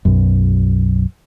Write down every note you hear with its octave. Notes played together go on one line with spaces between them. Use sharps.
B1 F#2